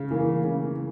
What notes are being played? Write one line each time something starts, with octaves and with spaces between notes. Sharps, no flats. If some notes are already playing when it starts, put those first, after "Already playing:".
Already playing: C#3
E3 A#3
C#3